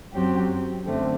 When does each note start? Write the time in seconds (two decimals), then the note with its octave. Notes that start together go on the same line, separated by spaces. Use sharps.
0.13 F#2 F#3 C4 G4
0.85 F#2 D3 A3 C4